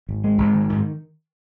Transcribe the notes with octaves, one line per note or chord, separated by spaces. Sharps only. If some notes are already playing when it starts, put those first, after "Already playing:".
G#1
G#3
G#1
D#3
G#2